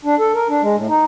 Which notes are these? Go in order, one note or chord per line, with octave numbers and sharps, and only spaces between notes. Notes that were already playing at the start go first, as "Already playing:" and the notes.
D4
A4
A#4
D4
G#3
A2
D#4